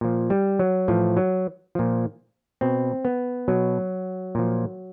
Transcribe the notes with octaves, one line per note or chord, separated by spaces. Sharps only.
A#2 F3
G3
F#3
A2 E3 F3
F#3
A#2 F3
B2 C4
B3
B2 F#3
A#2 F3